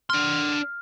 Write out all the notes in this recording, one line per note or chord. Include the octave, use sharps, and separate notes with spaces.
D4 C6 F6